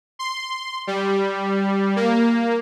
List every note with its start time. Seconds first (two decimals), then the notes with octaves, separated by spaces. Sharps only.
0.19 C6
0.87 G3
1.96 A#3